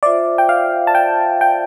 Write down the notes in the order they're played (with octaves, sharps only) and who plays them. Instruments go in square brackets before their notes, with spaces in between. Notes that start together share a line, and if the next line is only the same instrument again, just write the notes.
[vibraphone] F4 C5 E5 [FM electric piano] D5
[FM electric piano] G5
F5
A5
G5
G5